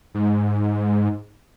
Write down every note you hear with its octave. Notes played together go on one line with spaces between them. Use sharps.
G#2